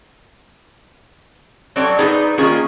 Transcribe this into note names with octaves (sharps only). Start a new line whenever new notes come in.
F#3 G3 C4 A4 C#5 D5
B3 D#4 G#4 B4 C5 D5
D#3 A#3 C#4 F4 G#4